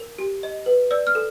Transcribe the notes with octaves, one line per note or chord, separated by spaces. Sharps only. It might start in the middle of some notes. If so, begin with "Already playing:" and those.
Already playing: A#4
G4
D#5
B4
D5 E6
F6
A4